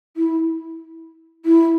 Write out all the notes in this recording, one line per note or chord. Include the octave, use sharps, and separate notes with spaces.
E4
E4